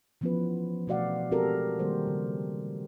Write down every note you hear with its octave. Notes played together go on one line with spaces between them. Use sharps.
E3 F3 B3 C#4 F4 B4
B2 A3 F#4 D5 F5 F#5
G#3 C4 F#4 G4 A4 A#4
D#3 G3 A#3 C5
C#3